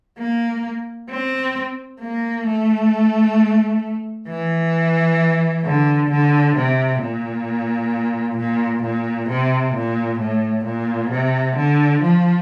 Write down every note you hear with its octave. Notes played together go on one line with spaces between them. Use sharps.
A#3
C4
A#3
A3
E3
D3
D3
C3
A#2
A#2
A#2
C3
A#2
A2
A#2
C3
D3
F3